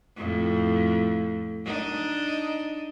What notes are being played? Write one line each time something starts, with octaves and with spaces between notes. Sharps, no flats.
F2 A2
D4 D#4 D#5